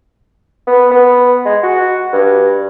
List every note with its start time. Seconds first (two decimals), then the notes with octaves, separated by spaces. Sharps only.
0.67 B3
0.91 B3
1.45 G#3
1.63 F#4
2.13 G2